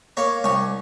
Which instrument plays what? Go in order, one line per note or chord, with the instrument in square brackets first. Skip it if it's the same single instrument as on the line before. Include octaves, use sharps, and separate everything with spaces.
[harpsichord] A#3 C#5
C2 C#5